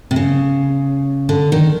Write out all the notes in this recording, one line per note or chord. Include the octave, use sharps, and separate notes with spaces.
C3
C#3
D3
D#3